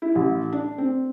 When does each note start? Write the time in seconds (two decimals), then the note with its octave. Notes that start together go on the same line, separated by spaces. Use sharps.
0.02 E4
0.15 A1
0.53 D4
0.78 C4